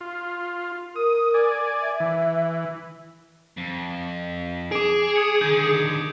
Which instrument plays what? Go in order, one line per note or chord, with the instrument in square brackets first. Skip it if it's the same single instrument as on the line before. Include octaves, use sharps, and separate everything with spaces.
[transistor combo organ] F4
[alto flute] A#4 [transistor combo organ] D#6
[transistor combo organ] D5 G#5
[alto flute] E5
[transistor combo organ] E3
[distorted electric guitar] F2
[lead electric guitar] G#4 [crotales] D6 D7
[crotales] D#6 G#6 C#7
[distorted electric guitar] D3 D#3 [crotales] G6